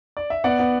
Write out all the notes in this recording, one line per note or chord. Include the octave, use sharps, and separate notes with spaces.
D5
E5
B3 D5 F#5
B3